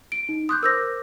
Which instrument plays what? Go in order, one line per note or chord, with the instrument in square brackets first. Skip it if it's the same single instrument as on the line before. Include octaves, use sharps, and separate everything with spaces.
[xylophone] D7
[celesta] D#4
[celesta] C6 D6 [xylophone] D#6 F#6 G6
[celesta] A#4 C5 D6 [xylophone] E6 G6 A#6